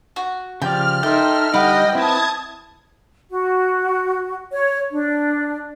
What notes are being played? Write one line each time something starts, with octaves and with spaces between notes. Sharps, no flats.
F#4
C#3 F3 G4 D5 F6
D#4 A4 A#4 E5 G5 C6
D3 G3 D#4 D#5 F#5 G5 B5 D6
C4 E4 B4 A5 D#6 G#6
F#4
C#5
D4